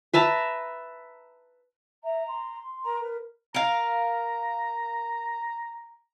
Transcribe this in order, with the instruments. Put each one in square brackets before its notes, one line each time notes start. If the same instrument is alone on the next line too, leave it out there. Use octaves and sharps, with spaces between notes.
[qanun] B4 E5 A5 A#5
[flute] E5 [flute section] A#5
[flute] C6
[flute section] A#4 A#5
[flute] A#4 [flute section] B4
[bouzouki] A#4 F5 [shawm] A#5